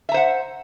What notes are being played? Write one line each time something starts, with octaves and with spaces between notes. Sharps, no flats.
C5 E5 F#5 A#5